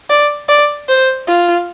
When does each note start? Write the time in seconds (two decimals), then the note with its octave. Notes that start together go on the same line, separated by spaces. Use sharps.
0.09 D5
0.48 D5
0.89 C5
1.27 F4